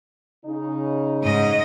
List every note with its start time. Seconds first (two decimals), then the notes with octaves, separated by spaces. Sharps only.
0.46 C#3 D#4
1.23 G#2 D#5